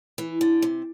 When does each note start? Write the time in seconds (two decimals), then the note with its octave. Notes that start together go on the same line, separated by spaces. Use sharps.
0.18 E3
0.41 D3
0.62 C3